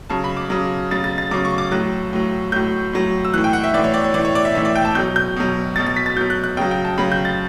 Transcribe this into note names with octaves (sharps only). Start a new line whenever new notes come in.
C#3 F#3 A5
B5
D6
C#3 F#3
C#3 F#3 A6
A6
A6
C#3 F#3 D6
C#6
D6
A2 F#3 F#6
A2 F#3
A2 F#3 G6
A2 F#3
E6
A2 E3 F#6
G5
F#5
E5
A2 E3 D5
C#5
D5
C#5
A2 E3 D5
C#5
D5
E5
A2 E3 E5
D5
G5
A5
B2 F#3 G6
G6
B2 F#3
B2 F#3 A6
A6
B6
A6
B2 F#3 G6
F#6
F#6
C#3 F#3 G5
G5
A5
C#3 F#3 B5
G6
A6